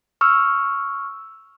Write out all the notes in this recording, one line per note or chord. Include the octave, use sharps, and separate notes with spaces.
C#6 E6 F6